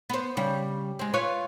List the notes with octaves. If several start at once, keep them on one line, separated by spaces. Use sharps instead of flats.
B3 C5
C#3 G3
G#3 C4
F4 B4 C#5